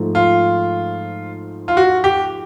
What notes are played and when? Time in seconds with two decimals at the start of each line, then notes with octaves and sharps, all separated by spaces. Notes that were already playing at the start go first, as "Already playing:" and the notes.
Already playing: G#2 F3 A3
0.15 F4
1.68 F4
1.77 F#4
2.04 G4